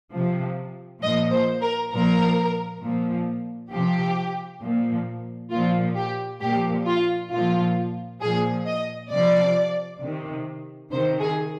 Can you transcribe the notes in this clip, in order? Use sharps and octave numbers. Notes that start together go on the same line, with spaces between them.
C3 F3
A#2 F3 D#5
C5
A#4
A#2 F3 A#4
A#2 F3
C3 F3 G4
A#2 F3
A#2 F3 F4
G4
A#2 F3 G4
F4
A#2 F3 F4
A#2 F3 G#4
D#5
C3 F3 D5
C3 D#3
C3 D#3 C5
G#4